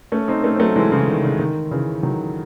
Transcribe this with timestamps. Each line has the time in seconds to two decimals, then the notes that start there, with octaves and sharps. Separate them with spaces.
0.12 A3 C#4
0.28 C4 D#4
0.44 A3 C#4
0.56 C4
0.59 F#3 A3
0.76 E3 G#3
0.92 C#3 E3
1.08 D#3
1.24 C#3
1.39 D#3
1.71 C#3 E3
2.03 D#3 F#3